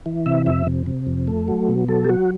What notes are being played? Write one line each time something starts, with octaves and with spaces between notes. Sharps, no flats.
E3
C3 E5
F2 E5
C3
C3
F2
A3
F#3
B2
F#3 A4
G4
F#3 F#4